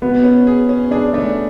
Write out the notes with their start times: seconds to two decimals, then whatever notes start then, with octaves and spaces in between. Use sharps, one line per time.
0.02 B2 B3
0.24 C#4
0.47 G#4
0.69 C#4
0.91 D4 G#4
1.14 A3 D4